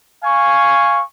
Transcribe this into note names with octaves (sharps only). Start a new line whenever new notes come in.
F5 G#5 C#6